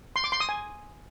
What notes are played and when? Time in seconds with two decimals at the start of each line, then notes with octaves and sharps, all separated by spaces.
0.16 C6
0.24 D6
0.32 C6
0.40 D#6
0.49 G#5